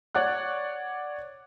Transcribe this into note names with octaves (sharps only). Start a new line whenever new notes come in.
C#5 D5 F#5 F#6